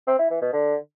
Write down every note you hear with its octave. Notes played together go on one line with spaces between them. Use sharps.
C4
E4
E3
B2
D3